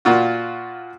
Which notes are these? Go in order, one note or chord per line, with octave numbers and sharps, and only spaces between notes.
A#2 F4 F#4